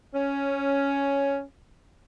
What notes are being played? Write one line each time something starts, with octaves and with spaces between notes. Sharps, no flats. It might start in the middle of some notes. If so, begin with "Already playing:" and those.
C#4